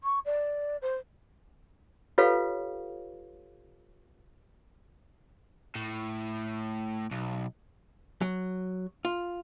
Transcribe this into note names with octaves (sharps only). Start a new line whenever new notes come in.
C#6
D5
C5
F4 G4 A4 B4 C#5 F5
A2
B1
F#3
F4